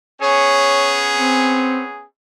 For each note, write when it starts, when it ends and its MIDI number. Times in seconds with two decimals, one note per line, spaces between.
0.21 2.03 59
0.21 2.03 61
0.21 2.03 68
0.21 1.01 73
1.16 1.83 60